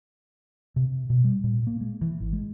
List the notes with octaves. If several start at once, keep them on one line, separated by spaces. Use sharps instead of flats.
C3
B2
G3
A#2
A#3
G#3
E3
G#1
G#3